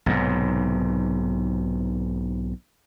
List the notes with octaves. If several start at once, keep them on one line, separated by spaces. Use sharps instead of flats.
B1 G#2 C3